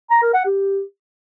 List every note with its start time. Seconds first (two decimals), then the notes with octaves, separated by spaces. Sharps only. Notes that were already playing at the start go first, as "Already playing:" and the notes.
0.10 A#5
0.22 A#4
0.34 F#5
0.45 G4